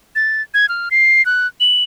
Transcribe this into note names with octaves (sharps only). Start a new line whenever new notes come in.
A6
G#6
F6
C7
F#6
F#7